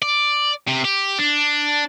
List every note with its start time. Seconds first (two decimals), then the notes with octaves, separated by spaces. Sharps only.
0.02 D5
0.68 C3
0.85 G4
1.19 D4